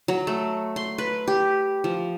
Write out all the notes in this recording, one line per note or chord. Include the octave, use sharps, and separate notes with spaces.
F#3
A3
C6
B4
G4
F3